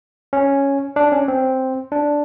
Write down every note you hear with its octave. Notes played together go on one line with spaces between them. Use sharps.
C#4
D4
C#4
C4
D4